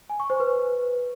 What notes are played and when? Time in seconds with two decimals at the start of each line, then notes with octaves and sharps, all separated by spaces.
0.10 G#5
0.20 C#6
0.30 C5
0.40 B4